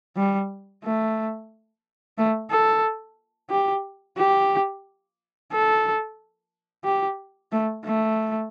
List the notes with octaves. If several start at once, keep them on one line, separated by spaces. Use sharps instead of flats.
G3
A3
A3
A4
G4
G4
A4
G4
A3
A3